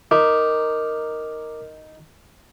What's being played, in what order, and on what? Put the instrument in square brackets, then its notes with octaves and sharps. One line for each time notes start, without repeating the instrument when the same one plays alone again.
[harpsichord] D#4 [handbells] A#4 [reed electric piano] D6